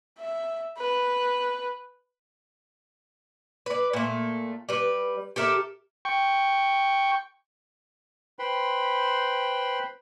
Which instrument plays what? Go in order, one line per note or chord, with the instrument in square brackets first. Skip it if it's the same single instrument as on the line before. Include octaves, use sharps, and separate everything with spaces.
[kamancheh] E5
B4
[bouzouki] B4 D5
A#2 A3
G3 B4
G4 A4 A#4 E5
[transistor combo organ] G5 C#6
[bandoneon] B4 C5 G5 B5 C6